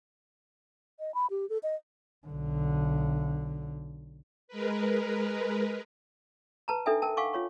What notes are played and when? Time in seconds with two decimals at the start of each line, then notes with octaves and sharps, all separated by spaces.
1.00 D#5
1.14 B5
1.30 G4
1.49 A4
1.63 D#5
2.27 B1 D3
4.48 G#3 A#4 B4
6.68 B4 A5 A#5
6.86 D4 D#4 A4 E5 G5 G#5
7.02 A#4 G5 A5
7.17 F5 F#5 G#5 C#6 D6
7.33 F4 C#5 C#6